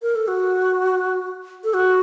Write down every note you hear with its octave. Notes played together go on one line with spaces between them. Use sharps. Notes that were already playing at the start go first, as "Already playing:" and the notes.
A#4
A4
F#4
A4
F#4